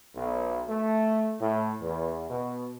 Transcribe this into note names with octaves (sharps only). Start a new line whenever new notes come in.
B1
A3
A2
E2
B2